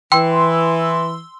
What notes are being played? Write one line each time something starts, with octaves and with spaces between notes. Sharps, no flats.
E3 G5 C6 E6